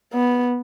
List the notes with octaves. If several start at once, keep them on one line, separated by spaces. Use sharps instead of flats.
B3